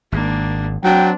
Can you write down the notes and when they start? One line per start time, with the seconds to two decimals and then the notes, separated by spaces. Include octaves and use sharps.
0.12 G#1 A#3 D4
0.84 F#3 C4 D4 G5